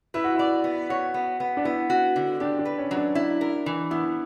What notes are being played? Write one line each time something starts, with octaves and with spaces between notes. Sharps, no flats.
E4 B4
F#4
E4 D5
B3
F#4 C#5
B3
B3
D4
B3 E4
F#4
D3
D4 G4
D4
B4
C#4
F#3
D4
E4
A#4
E3
B3 E4